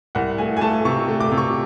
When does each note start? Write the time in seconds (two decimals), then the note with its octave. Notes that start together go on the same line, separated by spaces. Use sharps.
0.15 C2 F#5
0.38 A3 G#5
0.57 G#5
0.61 A3 A5
0.85 C3 C#6
1.08 A3
1.20 D6
1.31 C3
1.38 C#6